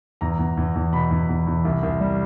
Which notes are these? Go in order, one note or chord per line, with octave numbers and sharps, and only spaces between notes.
E2 A#5
E2
E2
E2
B2 B5
E2
E2
E2
C2
C2
G3